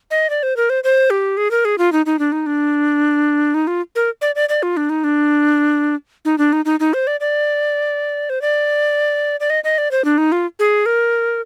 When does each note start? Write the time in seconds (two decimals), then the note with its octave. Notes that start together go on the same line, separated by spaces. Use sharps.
0.11 D#5
0.30 D5
0.43 C5
0.57 A#4
0.70 C5
0.84 C5
1.10 G4
1.37 G#4
1.51 A#4
1.65 G#4
1.78 F4
1.92 D#4
2.06 D#4
2.19 D4
2.32 D#4
2.46 D4
3.54 D#4
3.67 F4
3.96 A#4
4.21 D5
4.35 D5
4.49 D5
4.63 F4
4.77 D4
4.90 D#4
5.04 D4
6.25 D#4
6.38 D4
6.53 D#4
6.65 D#4
6.80 D#4
6.94 C5
7.07 D5
7.20 D5
8.30 C5
8.42 D5
9.40 D5
9.50 D#5
9.64 D#5
9.78 D5
9.91 C5
10.05 D4
10.18 D#4
10.32 F4
10.59 G#4
10.86 A#4